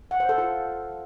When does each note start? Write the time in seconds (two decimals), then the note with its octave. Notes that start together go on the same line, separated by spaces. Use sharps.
0.11 F#5
0.20 C5
0.29 A4
0.38 F4